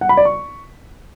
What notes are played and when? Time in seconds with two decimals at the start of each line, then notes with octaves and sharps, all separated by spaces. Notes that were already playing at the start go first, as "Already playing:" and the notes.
0.01 F#5
0.09 B5
0.17 D5
0.25 C#6